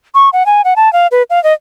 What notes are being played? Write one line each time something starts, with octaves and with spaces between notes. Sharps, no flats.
C#6
F#5
G#5
F#5
A5
F5
B4
F5
D#5